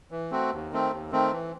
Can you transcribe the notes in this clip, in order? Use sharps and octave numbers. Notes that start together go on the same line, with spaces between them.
E3
A3 C4 F#4
D#2
D#3 A3 C4
D#2
D#3 A3 C4
E3